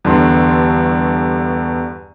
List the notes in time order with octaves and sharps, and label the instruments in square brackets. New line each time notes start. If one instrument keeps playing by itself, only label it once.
[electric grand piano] E2 G2 D3 D4 C6